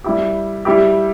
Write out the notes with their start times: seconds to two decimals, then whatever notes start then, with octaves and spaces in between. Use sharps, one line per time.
0.04 G3 E4 G4
0.65 G3 E4 G4